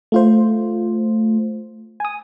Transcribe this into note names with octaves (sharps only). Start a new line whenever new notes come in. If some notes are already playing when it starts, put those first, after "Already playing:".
A3 F4 C5
G#5 D#6